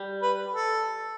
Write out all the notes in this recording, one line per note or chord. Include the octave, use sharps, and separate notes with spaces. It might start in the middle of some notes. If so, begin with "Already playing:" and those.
Already playing: G3
B4
A4